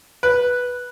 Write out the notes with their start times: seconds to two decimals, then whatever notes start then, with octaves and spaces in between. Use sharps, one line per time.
0.23 B4